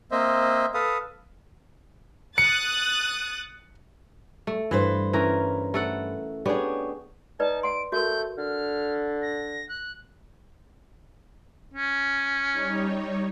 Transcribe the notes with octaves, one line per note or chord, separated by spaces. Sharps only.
A#3 C4 C5 D#5 E5
A4 B4 F5 D#6
D#6 F#6 A6 C#7
A3
G2 E3 B4 C5
E3 C#4 A#4 A#5
A3 A4 F#5
B3 D4 G4 G#4 C#5
D#4 B4 D5 A5
F#5 C6 D7
A3 F#4 A#4 G6
D3 F6
A#6
F#6
C#4
G3 D#4 C#5